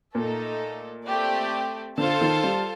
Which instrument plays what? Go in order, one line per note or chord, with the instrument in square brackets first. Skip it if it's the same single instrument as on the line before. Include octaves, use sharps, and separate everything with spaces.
[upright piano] A#2 [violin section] A3 D#4 A4
[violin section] A3 C4 G4 D5
[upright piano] D3 [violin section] F4 A4 C5 F5 A5
[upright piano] D#3
G3